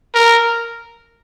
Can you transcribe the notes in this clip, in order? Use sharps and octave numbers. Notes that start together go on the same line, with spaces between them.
A#4